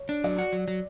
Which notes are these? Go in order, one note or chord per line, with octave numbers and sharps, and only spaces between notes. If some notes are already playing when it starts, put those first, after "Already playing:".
Already playing: C#5
D4
F#3 D5
F#4
F#3
F#3